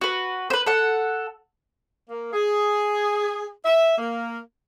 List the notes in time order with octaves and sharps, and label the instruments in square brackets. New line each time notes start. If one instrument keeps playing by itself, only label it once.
[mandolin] F#4 B4
B4 C5
A4 F#5
[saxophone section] A#3
G#4
E5
A#3